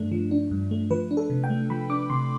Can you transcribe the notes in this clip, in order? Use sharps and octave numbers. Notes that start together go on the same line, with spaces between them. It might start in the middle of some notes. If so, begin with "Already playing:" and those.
Already playing: G2 A3 D4
F3
D4
G2
A3
F3 B4
D4
A4
C3
G5
A3
F3 B5
D4 D6
C3 C6